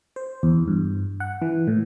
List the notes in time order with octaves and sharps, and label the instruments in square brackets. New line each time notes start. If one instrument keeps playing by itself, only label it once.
[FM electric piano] C5
E2
G2
F#5
E3
A2